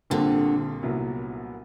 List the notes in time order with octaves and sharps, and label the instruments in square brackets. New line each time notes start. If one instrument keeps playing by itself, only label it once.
[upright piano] A#1 A#2 G3 C4 [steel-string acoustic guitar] D3
[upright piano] C2 A#2 F#3 B3 E4